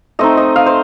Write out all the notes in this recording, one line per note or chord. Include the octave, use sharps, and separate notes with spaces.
A3 C4 D#4 D#5
D#5
F5
C5